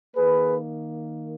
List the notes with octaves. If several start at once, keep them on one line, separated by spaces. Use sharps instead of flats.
D#3 A#3 G#4 B4